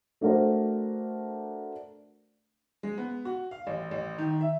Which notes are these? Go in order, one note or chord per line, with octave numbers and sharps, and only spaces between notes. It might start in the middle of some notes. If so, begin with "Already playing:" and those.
A3 D4 F#4 A#4 C5 D5
G#3
B3
F#4
F5
A1
A1
D#3
E5